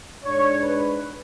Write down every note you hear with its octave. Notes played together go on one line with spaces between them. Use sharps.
G#2 G#3 D4 C#5
B4